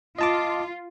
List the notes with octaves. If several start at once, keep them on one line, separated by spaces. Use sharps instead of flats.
F4 D#5 A5 D6